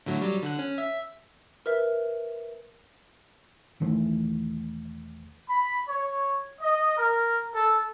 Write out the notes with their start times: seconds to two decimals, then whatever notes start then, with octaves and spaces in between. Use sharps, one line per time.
0.06 A2 D3 F#3
0.21 F#3 G3
0.43 D3 F#6
0.59 C#4
0.78 E5
1.66 A#4 B4 E5
3.80 E1 D#3 E3 A3
5.48 B5
5.88 C#5
6.60 D#5
6.96 A#4
7.52 A4